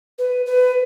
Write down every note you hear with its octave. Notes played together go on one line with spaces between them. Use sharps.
B4
B4